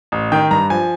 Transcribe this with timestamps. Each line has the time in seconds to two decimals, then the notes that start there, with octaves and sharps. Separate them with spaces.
0.12 A1
0.32 D#3 G5
0.51 G2 A#5
0.70 F3 G#5